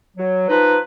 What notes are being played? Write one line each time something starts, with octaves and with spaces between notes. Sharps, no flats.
F#3
F3 D#4 B4